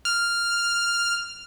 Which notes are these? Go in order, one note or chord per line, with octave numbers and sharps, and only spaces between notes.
F6